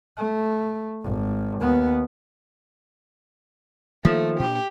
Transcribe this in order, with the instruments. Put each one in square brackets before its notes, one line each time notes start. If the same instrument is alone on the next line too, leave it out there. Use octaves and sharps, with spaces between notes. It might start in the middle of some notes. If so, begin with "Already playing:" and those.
[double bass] A3
G#1
D#2 B3
[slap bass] D#3 A#3 [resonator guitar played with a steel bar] F3 [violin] A3
[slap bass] A#2 D4 [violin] G4